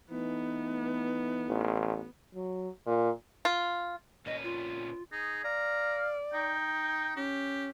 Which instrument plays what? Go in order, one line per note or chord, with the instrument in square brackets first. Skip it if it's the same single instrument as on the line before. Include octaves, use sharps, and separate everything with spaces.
[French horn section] E3 A3 D#4 [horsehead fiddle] B3
[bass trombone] A1
[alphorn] F#3
A#2
[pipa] F4
[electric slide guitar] A#2 C#4 B4 [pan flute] D#5
[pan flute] F4
[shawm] D#4 [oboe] G#4
[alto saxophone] D5 [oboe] F5 [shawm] A#5
[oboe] D#4 [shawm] G5
[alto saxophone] C#4 [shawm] G4